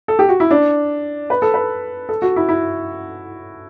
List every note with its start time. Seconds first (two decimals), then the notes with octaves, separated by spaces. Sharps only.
0.08 A4
0.19 G4
0.29 F#4
0.40 E4
0.51 D4
1.30 B4
1.42 A4
1.54 B4
2.09 A4
2.22 F#4
2.36 E4
2.49 E4